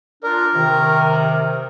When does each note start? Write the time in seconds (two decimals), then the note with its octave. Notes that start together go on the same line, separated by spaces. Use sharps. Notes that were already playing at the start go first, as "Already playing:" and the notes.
0.23 D4 F4 A#4
0.55 C3 D#3